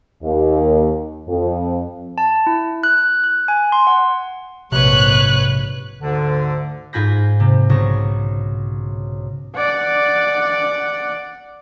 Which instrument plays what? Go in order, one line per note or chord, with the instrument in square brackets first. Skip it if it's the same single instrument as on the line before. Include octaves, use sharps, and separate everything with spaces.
[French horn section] D#2
F2
[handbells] A5
E4
F#6
F#6
G#5
C6
F#5
[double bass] A#1 G#2 [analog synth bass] C3 [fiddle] B4 C#5 [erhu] F#6
[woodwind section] D2 G#2 D3
[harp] G#2 F4 G#5 B5 G6 A#6
C3
B1 C#3 C#6 A#6
[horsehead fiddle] D5 F#5